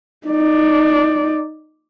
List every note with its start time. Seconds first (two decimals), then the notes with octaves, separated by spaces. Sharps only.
0.28 D#4 D5